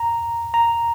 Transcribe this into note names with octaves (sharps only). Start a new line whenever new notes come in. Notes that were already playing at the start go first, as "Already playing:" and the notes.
Already playing: A#5
A#5